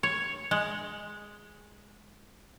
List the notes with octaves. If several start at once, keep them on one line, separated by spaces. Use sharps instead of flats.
C#5
G#3